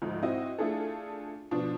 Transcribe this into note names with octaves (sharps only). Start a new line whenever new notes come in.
D2 G#2 F3 D#4
C4 E4 F#4 D#5
A3 D4 E4 F4 G#4 A4
B2 F3 D4